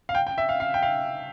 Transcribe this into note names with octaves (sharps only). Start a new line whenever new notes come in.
F5
G5
G5
E5
F5
F5
G5
F5